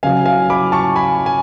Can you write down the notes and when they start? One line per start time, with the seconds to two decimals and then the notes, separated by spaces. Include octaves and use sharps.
0.03 C#3 F#3 F5 G#5
0.26 F5 G#5
0.50 B5 D6
0.72 A5 C#6
0.96 G#5 B5
1.26 G#5